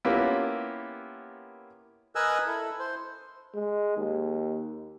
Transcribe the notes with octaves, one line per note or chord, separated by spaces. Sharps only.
A#3 B3 C#4 E4 F4 G4
A#4 B4 D#5 G#5 E6 F#6
E4 A4
C5
G#3
D#2